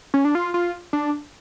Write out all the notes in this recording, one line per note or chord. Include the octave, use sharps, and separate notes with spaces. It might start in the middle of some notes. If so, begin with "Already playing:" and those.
C#4
D4
F4
F4
D4